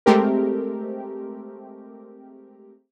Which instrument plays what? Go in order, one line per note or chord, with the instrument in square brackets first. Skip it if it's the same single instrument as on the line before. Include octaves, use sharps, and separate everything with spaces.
[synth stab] G#3 A3 C4 G4 A#4